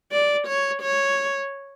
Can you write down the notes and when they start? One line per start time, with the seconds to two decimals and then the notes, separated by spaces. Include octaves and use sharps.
0.12 D5
0.47 C#5
0.82 C#5